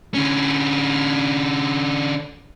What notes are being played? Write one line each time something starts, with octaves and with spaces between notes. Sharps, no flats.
D3 C#4